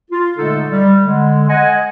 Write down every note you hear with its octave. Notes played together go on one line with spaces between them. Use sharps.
F4
A#2 D3 G#3 A3 D#4 A4
G3
D3 G#3
D#5 F#5 G#5